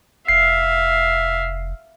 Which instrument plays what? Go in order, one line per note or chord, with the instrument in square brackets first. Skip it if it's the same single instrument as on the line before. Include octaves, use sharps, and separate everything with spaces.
[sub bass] F1 [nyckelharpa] E5 F5 [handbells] C7